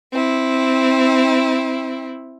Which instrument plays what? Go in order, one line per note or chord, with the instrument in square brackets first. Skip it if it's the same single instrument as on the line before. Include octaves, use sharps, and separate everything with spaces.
[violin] C4 E4